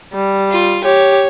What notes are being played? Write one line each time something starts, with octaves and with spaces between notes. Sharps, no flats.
G3
F4
G4 C#5